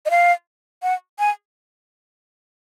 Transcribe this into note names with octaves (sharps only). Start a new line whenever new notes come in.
D#5
F5
F#5
G#5